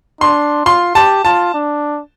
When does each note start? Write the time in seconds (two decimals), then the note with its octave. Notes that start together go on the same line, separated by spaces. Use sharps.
0.21 D4 C6
0.66 F4 C6
0.95 G4 A5
1.25 F4 A5
1.54 D4